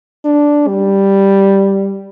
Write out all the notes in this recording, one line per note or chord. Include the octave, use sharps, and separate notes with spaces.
D4
G3